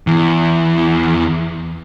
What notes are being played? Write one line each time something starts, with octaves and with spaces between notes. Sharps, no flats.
E2 E3